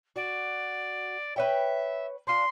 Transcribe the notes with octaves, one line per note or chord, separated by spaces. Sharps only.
F#4 D5
B4 C#5 E5 G5
D4 F4 C6